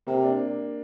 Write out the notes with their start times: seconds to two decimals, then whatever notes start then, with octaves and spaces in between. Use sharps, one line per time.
0.07 C3 A#3
0.24 D4